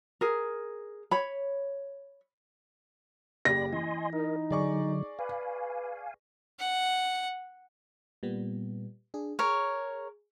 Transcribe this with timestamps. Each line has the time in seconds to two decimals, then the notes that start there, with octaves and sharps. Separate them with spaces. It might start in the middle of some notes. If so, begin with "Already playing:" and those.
0.21 G#4 A#4
1.11 C#5 B5
3.45 F#1 G4 D5 B5 A#6
3.72 E3 D#5 G#5 C6
4.13 D#4 A#4 D#5
4.51 D3 F#3 G#4 D5 C#6
5.19 B4 F5 G#5
6.60 F#5
8.23 A#2 G3 B3
9.14 D4 G#4
9.39 G#4 A#4 C#5